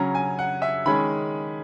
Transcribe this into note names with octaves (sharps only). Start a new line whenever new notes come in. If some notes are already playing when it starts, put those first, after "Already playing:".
Already playing: C#3 F#3 C#4 A#5
G#5
F#5
E5
D#3 G#3 C#4 B5